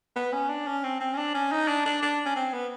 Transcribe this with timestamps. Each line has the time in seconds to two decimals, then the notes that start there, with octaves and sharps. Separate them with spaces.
0.16 B3
0.33 C#4
0.49 D4
0.67 C#4
0.84 C4
1.00 C4
1.14 C#4
1.18 D4
1.34 C#4
1.52 D#4
1.68 D4
1.85 D4
2.02 D4
2.26 C#4
2.36 C4
2.53 B3